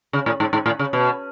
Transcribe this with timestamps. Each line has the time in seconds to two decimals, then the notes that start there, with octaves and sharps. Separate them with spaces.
0.13 C#3
0.26 A2
0.40 G#2
0.53 G#2
0.66 A2
0.79 C#3
0.93 B2